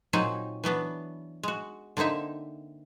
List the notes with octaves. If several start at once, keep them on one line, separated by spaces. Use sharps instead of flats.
A#2 F#3 C4 D#4 G#4
E3 F#3 B3 D4
G#3 F#4
D3 A#3 C4 D#4 E5